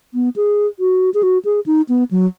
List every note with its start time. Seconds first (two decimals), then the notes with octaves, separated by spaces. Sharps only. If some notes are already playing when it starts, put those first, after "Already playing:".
0.14 B3
0.36 G#4
0.79 F#4
1.14 G#4
1.23 F#4
1.45 G#4
1.66 D#4
1.89 B3
2.11 F#3